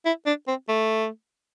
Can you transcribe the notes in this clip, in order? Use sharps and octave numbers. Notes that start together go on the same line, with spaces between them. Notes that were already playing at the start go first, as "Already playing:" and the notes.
E4
D4
C4
A3